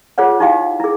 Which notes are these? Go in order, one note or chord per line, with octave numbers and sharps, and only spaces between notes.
F4 G#4 C5 C#5 F#5
D#4 E4 G4 F5 G5
E4 G#4